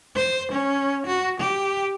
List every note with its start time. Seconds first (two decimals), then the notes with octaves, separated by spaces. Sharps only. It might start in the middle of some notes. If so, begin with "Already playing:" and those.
0.16 C5
0.52 C#4
1.07 F#4
1.41 G4